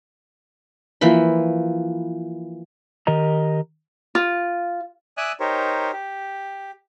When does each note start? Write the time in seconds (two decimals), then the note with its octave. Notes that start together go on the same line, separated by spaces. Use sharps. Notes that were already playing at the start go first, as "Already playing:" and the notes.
1.01 E3 F3 A#3 B5
3.07 D#3 G4 A#4 D#5 A#5
4.15 F4
5.17 D5 E5 G#5 D#6 E6 F#6
5.40 D#4 G4 A#4 C5 C#5
5.93 G4